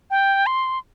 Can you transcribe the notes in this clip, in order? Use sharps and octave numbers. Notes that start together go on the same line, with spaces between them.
G5
C6